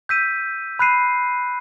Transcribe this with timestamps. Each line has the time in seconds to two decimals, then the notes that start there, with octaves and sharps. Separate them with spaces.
0.09 E6 G6 B6 D#7
0.79 B5 F#6 C7 D#7